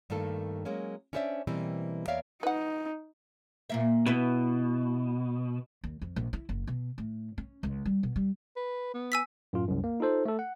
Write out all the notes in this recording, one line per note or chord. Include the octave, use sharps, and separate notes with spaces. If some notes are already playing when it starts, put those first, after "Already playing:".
G2 D#3 A3 A#3 A4
F#3 G#3 A#3 C#4
C#4 D4 E4 C5 D5 E5
B2 E3 G3 A#3 C4
E2 A#3 C#5 D5 E5 F5
D#4 B4 F#5
A#2 A#3 E5
B2 E4 B4
D#2
F2
A#1
E4
F#1
B2
A2
C#4
C#2
G3
B2
G3
B4
B3
G#5 E6 B6
F#2 A2 F4
C2 F#2
A#3
D#4 F4 A4 C5
A3 A4
F#5